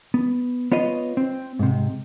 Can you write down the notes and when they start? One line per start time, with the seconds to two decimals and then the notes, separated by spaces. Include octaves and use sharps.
0.14 B3
0.72 B3 F4 C#5 D#5
1.17 C4
1.59 G#2 C3